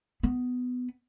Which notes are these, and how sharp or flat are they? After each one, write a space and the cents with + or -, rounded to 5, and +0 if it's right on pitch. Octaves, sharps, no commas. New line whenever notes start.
B3 +15